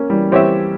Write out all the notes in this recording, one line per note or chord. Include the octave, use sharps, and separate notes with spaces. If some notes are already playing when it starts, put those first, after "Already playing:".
Already playing: A#3 C#4
E3 G3
E3 C4 G4 C#5 E5